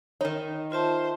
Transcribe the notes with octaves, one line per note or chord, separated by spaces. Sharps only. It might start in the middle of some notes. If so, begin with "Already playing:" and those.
D#3 D#4 C#5
F4 C5 E5 A5